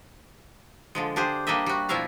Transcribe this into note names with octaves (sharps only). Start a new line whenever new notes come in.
D3 F3 G#3
D4 G4 G#4 C5
G3 A#3 D4 D#5 E5
G3 F#4
B2 F3 E4 E5 F5 A#5